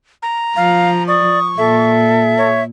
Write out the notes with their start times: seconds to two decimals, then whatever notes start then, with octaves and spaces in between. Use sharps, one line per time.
0.22 A#5
0.56 F3 F5
1.08 D5 C#6 D#6
1.58 A#2 A4 E5
2.38 C#5